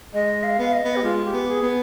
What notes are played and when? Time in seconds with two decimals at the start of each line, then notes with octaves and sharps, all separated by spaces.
0.14 G#3 D#5
0.43 F5
0.59 B3
0.73 D#5
0.84 B3
0.96 G4
1.03 G#3 F4
1.25 G4
1.33 B3
1.48 G#4
1.62 B3